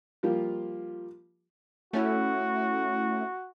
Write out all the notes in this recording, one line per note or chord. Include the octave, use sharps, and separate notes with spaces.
F3 G3 A#3 F4 G4
A3 C#4 E4 F#4